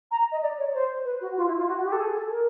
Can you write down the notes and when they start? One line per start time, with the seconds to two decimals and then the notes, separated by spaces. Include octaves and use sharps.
0.11 A#5
0.32 D#5
0.42 D5
0.58 C#5
0.74 C5
1.05 B4
1.21 F#4
1.37 F4
1.47 E4
1.58 F4
1.68 F#4
1.84 G4
1.92 A4
2.00 G#4
2.15 A4
2.31 A#4